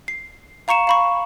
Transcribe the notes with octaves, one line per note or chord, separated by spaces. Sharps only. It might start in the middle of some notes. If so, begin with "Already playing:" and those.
C7
F5 A#5 C#6 C#7 E7
F5 B5 C#6